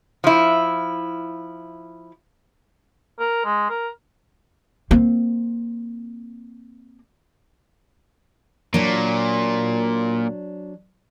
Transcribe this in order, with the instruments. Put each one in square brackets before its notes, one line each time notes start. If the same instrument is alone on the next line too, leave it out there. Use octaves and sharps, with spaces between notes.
[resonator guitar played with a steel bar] F3 E4
[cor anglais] A#4
G#3
A#4
[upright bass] A#3 C4
[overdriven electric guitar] A#2 [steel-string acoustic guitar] F#3 D4